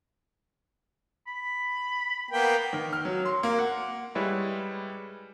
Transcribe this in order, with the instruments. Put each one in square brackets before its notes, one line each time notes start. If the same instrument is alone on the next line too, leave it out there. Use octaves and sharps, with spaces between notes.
[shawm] B5
[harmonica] A#3 B3 G5
[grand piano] D#3
F6
F#3
C6
A#3
F#5
[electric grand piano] G3 G#3 E4 B4 C#5 E5